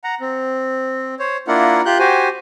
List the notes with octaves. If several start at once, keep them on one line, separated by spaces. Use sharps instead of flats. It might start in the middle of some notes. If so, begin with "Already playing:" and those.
F#5 A#5
C4
C5 C#5
A#3 D4 E4 F4 A#4 F#5
F4 G4 F#6 G6
F#4 G4 C5 G#5